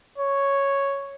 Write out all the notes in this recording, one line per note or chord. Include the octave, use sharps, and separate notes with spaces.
C#5